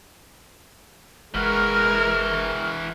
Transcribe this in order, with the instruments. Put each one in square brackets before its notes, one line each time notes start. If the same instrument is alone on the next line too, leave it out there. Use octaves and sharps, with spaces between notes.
[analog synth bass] F#1 [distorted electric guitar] E3 F#4 [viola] G#3 A#4 [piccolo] F6